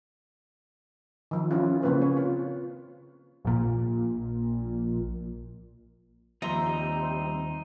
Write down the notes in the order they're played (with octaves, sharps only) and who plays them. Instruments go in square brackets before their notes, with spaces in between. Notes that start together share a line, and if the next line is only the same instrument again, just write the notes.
[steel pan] D#3 F3
F3 C#4 E4 F4
C#3 A#3 C4 C#4 B4 C5
C#5
F4
[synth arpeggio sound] A#1 A#2
[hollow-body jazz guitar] D#2 F3 [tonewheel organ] G3 C4 [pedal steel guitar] D#4 C6 [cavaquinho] E5 A#5